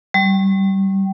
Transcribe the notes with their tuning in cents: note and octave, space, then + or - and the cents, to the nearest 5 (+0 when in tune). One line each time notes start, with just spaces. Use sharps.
G3 -20